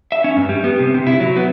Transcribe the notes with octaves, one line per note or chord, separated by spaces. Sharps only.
E5
C#4
G2
G3
B3
C3
C3
E4
F#3
B3